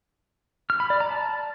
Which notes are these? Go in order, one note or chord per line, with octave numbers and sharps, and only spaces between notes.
F6
B5
D5
A#5
A5